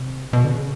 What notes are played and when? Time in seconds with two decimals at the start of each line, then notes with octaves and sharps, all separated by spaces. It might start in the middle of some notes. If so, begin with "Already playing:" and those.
Already playing: C3
0.33 B2
0.45 D3
0.49 C#3